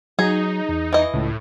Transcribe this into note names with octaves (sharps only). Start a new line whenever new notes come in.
F#3 D#4 G#4
E2
E3 D#5
C#2 A2